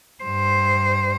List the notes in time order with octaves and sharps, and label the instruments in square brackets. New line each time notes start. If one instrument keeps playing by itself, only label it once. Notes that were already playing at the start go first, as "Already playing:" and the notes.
[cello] G2 C5